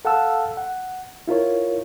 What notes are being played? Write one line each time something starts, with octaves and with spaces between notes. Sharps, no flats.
A4 F5 F#5 A5 E6
F#5
E4 F4 A#4 C#5